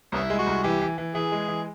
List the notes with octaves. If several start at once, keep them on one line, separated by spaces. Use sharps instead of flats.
C2 B3 C#4 E4
G#3
F#4
C2
E3 G4
E3
E3
E3 G#4
G#3
E3